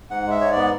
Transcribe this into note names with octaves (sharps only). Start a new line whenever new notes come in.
G#2 F#5
G#3 E5
G#2 C#5
D5
B3